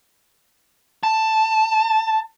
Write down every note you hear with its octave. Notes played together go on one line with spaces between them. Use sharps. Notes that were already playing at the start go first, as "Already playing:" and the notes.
A5